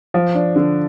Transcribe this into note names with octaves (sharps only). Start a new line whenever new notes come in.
F3
D4
D3